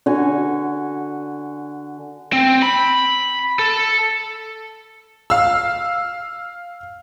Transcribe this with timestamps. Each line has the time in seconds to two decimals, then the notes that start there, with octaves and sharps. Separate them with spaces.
0.06 D3 F#4 G#5
2.33 C4
2.62 B5
3.59 A4
5.30 F5 E6